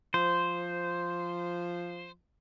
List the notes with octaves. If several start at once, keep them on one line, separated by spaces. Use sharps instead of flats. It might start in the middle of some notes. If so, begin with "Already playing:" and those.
F3 C5